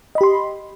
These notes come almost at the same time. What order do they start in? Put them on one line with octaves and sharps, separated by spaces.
D#5 B5 G4 C6